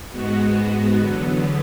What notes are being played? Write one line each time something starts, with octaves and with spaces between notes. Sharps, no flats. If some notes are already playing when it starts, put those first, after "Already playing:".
G#2 G#3 B3 F#4
E2 D3 F#3 B3